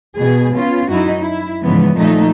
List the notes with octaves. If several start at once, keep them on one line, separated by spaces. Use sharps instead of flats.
B2 G#4
B3 C#4 F4
F#2 D#4 E4 F#4
E4
G#2 C#3 E3 F3 B3
A#2 D#3 F3 A3 D#4